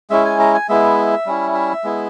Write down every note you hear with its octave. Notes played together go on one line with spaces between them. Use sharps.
G#3 C#4 E4 E5
G#5
A#5
G#5
G#3 B3 E4 E5
G3 C#4 E4
E5
G#3 B3 E4